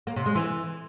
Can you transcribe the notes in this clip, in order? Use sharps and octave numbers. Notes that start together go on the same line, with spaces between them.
A#3
C3
G#3
E3